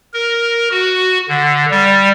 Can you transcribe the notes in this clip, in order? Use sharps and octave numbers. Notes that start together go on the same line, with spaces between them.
A#4
F#4
D3
G3